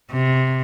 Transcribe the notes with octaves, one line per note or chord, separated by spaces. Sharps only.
C3